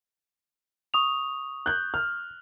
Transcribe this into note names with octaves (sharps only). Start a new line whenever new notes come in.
C#6 D#6 F7
F#6 G6
F6